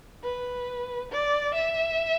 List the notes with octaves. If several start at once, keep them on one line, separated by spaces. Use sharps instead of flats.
B4
D5
E5